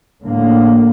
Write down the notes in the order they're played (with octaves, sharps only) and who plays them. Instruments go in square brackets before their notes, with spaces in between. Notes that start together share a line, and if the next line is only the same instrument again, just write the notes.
[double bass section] A2 D3 A#3